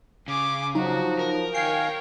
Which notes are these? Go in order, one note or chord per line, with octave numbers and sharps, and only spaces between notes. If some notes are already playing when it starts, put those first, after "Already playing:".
C#3 G#5 D6
F3 F#3 D#4 F#4
A#4
D#3 C#5 F5 G5 G#5 C7